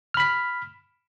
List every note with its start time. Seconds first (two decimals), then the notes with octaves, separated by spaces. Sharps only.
0.14 F6
0.17 B5
0.20 B6